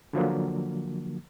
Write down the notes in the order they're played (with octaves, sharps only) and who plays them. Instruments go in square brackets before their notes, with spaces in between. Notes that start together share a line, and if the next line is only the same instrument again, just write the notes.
[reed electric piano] D3 F3 F#3 A#3